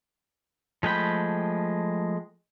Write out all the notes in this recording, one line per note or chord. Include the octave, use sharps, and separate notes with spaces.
F3 G#3 A3 G5 B5